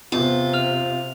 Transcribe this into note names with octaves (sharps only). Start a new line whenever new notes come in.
E2 C3 F4
F6 F7